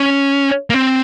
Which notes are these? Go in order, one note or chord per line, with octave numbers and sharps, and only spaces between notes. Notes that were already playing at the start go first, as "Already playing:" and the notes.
Already playing: C#4
A#3
C4